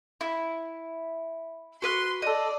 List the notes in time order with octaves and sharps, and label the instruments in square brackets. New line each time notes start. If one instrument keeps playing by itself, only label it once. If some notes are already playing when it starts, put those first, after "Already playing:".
[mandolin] E4
[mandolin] F#4 B4 F#6 [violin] C6
[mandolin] A4 D#5 [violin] D5